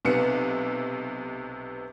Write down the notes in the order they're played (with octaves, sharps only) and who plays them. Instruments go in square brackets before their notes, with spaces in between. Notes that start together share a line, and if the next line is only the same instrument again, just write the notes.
[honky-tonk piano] B1 C3 B3 C#7